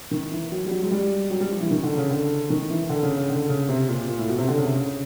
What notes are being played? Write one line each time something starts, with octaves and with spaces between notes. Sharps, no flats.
D#3
E3
F#3
G3
F#3
G#3
G3
F#3
G3
F3
E3
D#3
D3
C#3
D3
D#3
E3
D3
C#3
C#3
D3
C#3
C3
A#2
A#2
A2
B2
C3
D3
C#3
C3
C#3